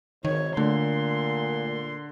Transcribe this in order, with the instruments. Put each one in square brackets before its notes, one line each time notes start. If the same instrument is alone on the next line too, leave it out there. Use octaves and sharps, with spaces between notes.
[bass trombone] G#1 [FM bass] D#3 [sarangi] C#5
[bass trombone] A#2 [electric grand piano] D3 [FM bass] A3 [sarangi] C6